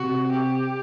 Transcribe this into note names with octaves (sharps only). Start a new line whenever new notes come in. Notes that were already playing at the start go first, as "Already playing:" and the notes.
Already playing: C3 F#4
G4